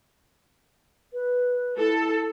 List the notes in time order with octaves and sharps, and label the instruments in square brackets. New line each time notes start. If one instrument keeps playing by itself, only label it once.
[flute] B4
[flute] E4 [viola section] A4